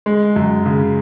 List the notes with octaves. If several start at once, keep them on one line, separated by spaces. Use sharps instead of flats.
G#3
F#2
C#3